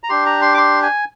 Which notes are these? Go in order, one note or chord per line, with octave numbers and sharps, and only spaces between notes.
A#5
D4 G4 C6
A#5
C6
D6
C6
G#5